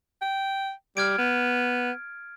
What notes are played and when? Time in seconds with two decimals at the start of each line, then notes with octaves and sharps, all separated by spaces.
0.22 G5
0.97 G3 F6 G#6 D7
1.18 B3